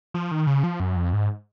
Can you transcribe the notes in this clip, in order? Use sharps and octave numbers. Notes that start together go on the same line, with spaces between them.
F3
D#3
C#3
F3
F#2
F2
G#2